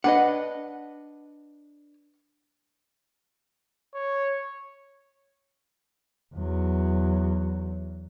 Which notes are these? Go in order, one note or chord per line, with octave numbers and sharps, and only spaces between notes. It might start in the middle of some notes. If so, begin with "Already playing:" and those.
D4 B4 D#5 F#5
C#5
E2 F#3